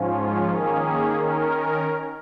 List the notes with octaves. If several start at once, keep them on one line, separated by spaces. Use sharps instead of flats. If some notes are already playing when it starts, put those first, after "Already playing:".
Already playing: G#2 F3 C#4 F4
D#3 A#3 C#4 G#4
D#3 C#4 A#4